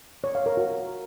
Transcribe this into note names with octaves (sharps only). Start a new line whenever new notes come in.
C#5
F5
A#4
F#4